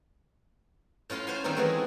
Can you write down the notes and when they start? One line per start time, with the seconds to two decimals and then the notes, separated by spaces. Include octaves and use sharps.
1.10 A2 C#4 F4 F5 C6
1.27 C5 C#5 F#5 G#5 C6
1.44 D#3 G3 C4 D#4 A#4
1.57 E3 G#3 A3 F#4 G#4